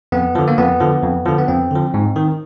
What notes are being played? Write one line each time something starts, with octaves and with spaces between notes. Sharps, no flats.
F2 B3
D3 F3
A#3
F2 B3
D3 F3
F2
D3 F3
B3
F2 C4
D3 F3
G#2
D#3